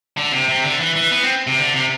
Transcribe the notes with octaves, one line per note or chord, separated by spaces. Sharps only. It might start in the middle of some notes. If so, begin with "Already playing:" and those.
D3
C3
C3
D3
E3
E3
B3
C4
C3
D3
C3